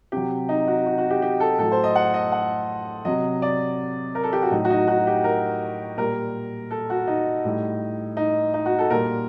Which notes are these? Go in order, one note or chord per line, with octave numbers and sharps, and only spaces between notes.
C3 F#3 G4
D#4
F#4
F#4
F#4
G4
G4
A4
A2 F#3 A4
C5
D#5
F#5
D#5
F#5
C3 F#3 D#5
D5
A#4
A4
G4
F#4
A2 F#3 D#4
F#4
D#4
F#4
G4
A#4
A#2 G3 A#4
A4
F#4
D#4
A2 G3
D#4
D#4
F#4
A4
A#2 G3 A#4